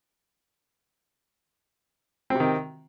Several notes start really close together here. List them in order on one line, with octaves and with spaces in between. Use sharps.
C4 C3 D#3